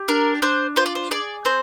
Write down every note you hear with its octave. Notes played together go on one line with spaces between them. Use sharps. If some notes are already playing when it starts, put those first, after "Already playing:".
Already playing: G4
D4 A#4
D4 C5
F4 C5
D5
C5
G#4 D5
C4 C5